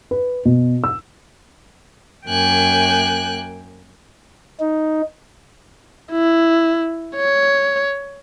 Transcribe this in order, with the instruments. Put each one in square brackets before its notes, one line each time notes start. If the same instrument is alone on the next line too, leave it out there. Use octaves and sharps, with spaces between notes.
[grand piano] B4
B2
E6
[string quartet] F#2 A#3 G5 G#5 F#6
[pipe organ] D#4
[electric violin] E4
C#5